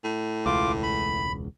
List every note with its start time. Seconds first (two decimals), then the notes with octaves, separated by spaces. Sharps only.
0.04 A2
0.46 E1 C#2 F4 D6
0.83 B5